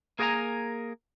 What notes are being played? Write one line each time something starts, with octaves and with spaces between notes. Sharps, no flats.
A#3 G#4 A#4 C#5 G#5 A#5